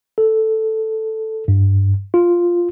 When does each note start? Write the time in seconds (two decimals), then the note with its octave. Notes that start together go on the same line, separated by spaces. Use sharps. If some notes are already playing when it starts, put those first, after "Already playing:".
0.18 A4
1.48 G2
2.14 F4